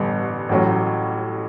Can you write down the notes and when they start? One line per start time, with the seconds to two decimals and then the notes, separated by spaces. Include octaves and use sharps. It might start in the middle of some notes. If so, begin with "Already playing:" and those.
Already playing: A1 G2 D3 G3 B3
0.49 A1 A2 F#3 C#4